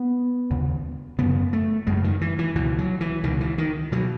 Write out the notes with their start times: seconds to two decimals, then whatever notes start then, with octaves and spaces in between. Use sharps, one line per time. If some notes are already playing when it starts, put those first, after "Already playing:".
Already playing: B3
0.50 D#2 C#3
1.18 F#2 C#3 B3
1.53 A3
1.87 F#2 C#3 G#3
2.04 D#3
2.21 E3
2.39 E3
2.55 C#2 B2 E3
2.78 F#3
3.01 E3
3.23 C#2 B2 D#3
3.40 E3
3.58 D#3
3.92 B2 F#3